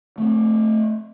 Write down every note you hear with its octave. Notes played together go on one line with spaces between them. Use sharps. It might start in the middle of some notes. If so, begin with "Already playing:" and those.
A3 C4